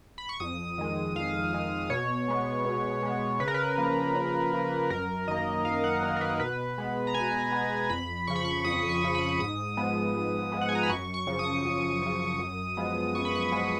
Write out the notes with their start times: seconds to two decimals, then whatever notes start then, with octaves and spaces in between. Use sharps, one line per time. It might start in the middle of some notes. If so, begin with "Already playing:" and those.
0.18 B5
0.29 C#6
0.40 F2 D#6
0.78 D#3 G#3
1.16 F2 F5
1.53 D#3 G#3
1.90 B2 C#5
2.28 G#3 B3
2.65 B2
3.03 G#3 B3
3.40 C#3 B4
3.48 A#4
3.54 B4
3.78 F3 A#3
4.15 C#3
4.53 F3 A#3
4.90 F#2 A#4
5.27 D#3 A#3 D#5
5.65 F#2 F5
5.84 F#5
6.03 D#3 A#3
6.17 A#4
6.21 B4
6.40 B2 B4
6.78 G#3 B3
7.07 A#5
7.14 B2 G#5
7.52 G#3 B3
7.90 F2 B5
8.27 C#3 F3 C#6
8.36 B5
8.45 C#6
8.64 F2 D#6
8.89 C#6
9.02 C#3 F3
9.15 B5
9.39 G#2 D#6
9.77 F3 G#3 B3
10.15 G#2
10.52 F3 G#3 B3
10.61 F#5
10.69 G#5
10.75 A#5
10.83 B5
10.89 F#2 C#6
11.14 C#6
11.27 C#3 F3
11.39 D#6
11.65 F#2
12.02 C#3 F3
12.39 F#2
12.77 F3 G#3 B3
13.15 F#2 C#6
13.25 B5
13.35 C#6
13.52 F3 G#3 B3